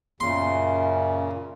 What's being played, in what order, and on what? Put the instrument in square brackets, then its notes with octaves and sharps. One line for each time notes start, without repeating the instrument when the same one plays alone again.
[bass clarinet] F#2 [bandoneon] A#2 C#3 [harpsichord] C6